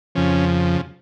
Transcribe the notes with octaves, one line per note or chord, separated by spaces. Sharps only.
F2 C#3 F3 C#4